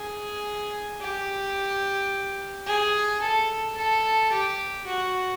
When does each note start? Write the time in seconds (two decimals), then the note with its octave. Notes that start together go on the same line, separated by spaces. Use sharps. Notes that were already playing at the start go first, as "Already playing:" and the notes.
Already playing: G#4
1.01 G4
2.66 G#4
3.22 A4
3.77 A4
4.32 G4
4.87 F#4